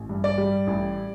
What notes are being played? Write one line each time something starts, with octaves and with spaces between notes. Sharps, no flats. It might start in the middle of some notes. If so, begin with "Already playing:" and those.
Already playing: A1
G2
D5
G3
A1